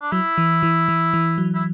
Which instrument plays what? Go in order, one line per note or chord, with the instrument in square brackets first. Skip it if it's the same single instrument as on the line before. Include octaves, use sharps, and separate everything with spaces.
[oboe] D4
[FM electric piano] F#3 [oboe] E4
[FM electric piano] E3
E3
E3
E3
F#3
[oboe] E4